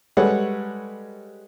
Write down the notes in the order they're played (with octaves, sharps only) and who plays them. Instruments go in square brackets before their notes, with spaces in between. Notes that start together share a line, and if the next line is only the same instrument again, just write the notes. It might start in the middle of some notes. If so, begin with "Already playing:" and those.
[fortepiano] G3 G#3 A4 B4 C#5 F#5